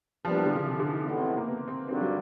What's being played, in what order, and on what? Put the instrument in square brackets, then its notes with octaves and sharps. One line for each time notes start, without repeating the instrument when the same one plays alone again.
[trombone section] A#1 A#2 G3 B3 D4 [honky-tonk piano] F3
[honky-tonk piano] E3
D3
C#3
C3
D3
D#3
[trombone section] A1 A2 E3 G#3 B3 [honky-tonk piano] A3
[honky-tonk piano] C4
A#3
B3
C4
[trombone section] G#1 G2 D3 F#3 [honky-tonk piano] C4
[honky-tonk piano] G3